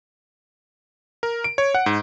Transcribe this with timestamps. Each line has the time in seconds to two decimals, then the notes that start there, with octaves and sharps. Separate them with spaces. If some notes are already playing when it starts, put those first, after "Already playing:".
1.23 A#4
1.44 D7
1.58 C#5
1.75 F#5
1.86 G#2